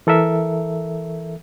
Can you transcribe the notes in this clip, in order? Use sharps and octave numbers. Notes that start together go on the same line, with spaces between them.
E3 A4 A#4 E5